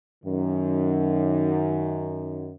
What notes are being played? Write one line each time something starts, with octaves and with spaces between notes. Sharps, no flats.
F#2 D#3